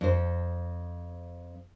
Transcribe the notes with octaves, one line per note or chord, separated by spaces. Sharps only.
F2 C5